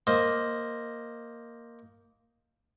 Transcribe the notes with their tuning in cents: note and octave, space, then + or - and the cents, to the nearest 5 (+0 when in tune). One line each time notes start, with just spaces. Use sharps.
A#3 +0 C5 +5 D#5 +0